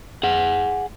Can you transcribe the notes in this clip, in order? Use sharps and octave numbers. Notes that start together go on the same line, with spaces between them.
G#4 F#5